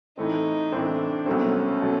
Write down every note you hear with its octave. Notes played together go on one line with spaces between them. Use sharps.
A2 E3 A3 C4 D#4
A2 E3 A3 C4 D4
C2 B2 F#3 A3 C4 C#4
B2 F#3 A3